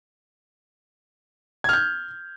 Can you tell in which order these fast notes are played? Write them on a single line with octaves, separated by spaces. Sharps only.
G#6 F6 G6